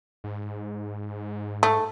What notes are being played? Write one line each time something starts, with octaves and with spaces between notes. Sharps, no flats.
G#2
A3